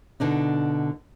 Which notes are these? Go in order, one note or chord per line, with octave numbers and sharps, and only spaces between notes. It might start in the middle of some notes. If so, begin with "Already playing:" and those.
B2 D3 D4 D#4